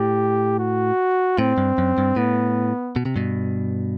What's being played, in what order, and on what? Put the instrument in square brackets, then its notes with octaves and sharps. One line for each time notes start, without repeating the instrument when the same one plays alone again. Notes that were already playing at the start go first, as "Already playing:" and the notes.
Already playing: [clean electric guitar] A2 [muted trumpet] G4
[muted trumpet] F#4
[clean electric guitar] A2 [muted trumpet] C4
[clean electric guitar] G2
F#2
G2
[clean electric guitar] A2 [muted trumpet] B3
[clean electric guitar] B2
C3
G2 B2